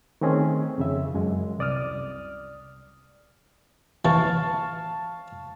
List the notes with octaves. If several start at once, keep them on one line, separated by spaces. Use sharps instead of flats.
D#3 A3 C4 C#4 G#4
F2 C#3 E5
F#2 G#3
C2 D5 D#6 F6
E3 F5 A5 C#6